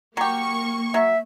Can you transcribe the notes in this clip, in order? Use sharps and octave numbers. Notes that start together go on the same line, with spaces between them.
F#3 A#3 G4 C#6
F#3 E5